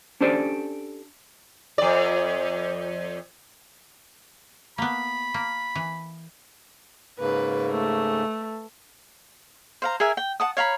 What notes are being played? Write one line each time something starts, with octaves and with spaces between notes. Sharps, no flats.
C#4 D4 G4 A4 C5 D5
F2 D5
A#3 B3 B5
A#3
E3
G#2 C#3 A#3 B4
A3
C5 F5 A#5
G#4 A#4 E5 G#5
G5
F#5 A5 D#6
C#5 F5 A#5 B5